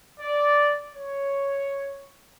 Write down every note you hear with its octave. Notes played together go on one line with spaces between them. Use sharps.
D5
C#5